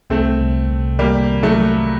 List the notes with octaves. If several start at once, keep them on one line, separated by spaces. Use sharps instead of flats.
C2 A3 C4
C2
C3
D#3 G3 A#3
C4
F#3 A3
F#3